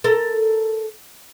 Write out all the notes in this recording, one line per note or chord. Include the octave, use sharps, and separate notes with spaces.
A4 A#4